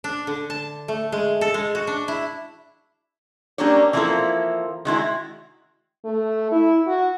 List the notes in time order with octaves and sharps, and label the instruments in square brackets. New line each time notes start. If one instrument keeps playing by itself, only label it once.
[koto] D4
D3
A5
A3
G#3
A4
G#3
F#4
D4
E4
[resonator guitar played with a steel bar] F#3 G3 A#3 C#4 D4 C#5
E3 F3 A#3 C4 E4 A4
D#3 G#3 E4 F#4
[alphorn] A3
E4
F#4